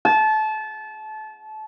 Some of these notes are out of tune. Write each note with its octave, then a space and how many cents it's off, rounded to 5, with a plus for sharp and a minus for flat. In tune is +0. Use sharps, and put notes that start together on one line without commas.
A5 -25